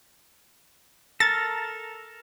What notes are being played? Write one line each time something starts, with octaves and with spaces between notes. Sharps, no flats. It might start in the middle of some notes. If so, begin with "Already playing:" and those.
A4 A#4 A6